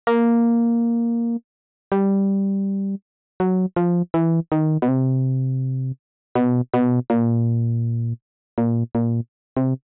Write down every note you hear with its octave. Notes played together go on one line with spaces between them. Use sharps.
A#3
G3
F#3
F3
E3
D#3
B2
C3
B2
B2
A#2
A#2
A#2
C3